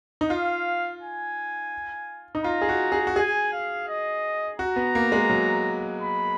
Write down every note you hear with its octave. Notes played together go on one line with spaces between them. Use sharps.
D#4
F4 F5
G#5
D#4
F4 A#5
G#4
F#4
G#4
F#4
G#4 G#5
F5
D#5
F#4 A#5
B3
A#3
G#3
F#3
B5